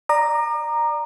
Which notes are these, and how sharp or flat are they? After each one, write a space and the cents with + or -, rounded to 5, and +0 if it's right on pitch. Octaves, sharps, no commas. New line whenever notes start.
D5 +10 A#5 +0 D6 +45